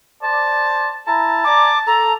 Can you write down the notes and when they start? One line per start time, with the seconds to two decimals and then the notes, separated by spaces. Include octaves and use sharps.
0.23 C5 D5 A5
1.07 E4 A5 A#5
1.44 D5 G#5 A#5 D6
1.86 A4 A#5